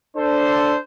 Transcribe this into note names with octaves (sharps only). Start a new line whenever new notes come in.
D4 A4 C5